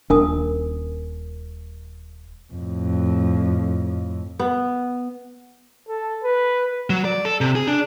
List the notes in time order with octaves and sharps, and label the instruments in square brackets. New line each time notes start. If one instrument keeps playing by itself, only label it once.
[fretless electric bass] D#1 D4 [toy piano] A#4 G#5 D#6
[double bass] F2 A2
[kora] B3
[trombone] A4
B4
[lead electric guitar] F#3
D5
A4
C3
G#4
D4